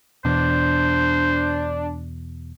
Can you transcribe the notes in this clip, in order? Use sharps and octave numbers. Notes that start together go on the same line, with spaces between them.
E2 B2 D4 C5